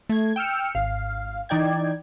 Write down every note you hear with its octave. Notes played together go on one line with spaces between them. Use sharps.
A3 G#6
G5 E6 F6 C#7
G#1 F5
E3 D#4 D5 G5 G#6